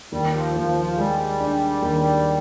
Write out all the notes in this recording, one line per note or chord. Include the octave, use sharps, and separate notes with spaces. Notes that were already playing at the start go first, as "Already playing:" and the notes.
D#2 G3
F3
D#2 F3
F3
G3 G#3
D4
D#2